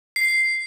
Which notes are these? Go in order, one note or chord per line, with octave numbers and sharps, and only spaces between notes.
C7